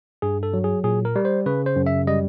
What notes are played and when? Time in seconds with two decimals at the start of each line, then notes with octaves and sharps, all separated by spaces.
0.22 G2 G#4
0.43 A4
0.54 F#3
0.64 G#4
0.84 A#2 G#4
1.05 A#4
1.16 G3
1.25 C5
1.46 C#3 B4
1.66 C5
1.76 F#2
1.86 E5
2.07 G3 D#5